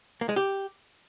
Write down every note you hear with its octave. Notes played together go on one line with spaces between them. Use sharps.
A#3
G#3
G4